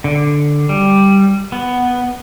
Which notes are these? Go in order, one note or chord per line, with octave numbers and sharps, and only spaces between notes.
D3
G3
B3